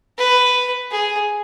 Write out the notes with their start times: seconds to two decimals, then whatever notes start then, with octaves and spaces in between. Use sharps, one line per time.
0.18 B4
0.91 G#4